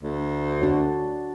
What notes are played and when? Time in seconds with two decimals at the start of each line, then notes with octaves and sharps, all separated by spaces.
0.03 D2
0.61 D4 F#4 C#5